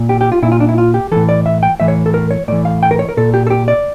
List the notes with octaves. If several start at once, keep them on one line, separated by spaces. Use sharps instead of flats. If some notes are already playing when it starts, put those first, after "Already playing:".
Already playing: A#2
G4
G4
F4
A#2 E4
F4
D4
E4
F4
G4
A2 E3 A4
D5
E5
G5
A2 E3 E5
C#5
A4
A#4
C#5
A2 E3 D5
F5
G5
A#4
C#5
A#4
A#2 A4
G4
A4
G4
D5